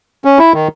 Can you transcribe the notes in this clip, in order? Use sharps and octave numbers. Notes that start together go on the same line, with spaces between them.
C#4
E4
D#3